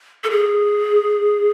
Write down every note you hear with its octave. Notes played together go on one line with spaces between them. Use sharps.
A4
G#4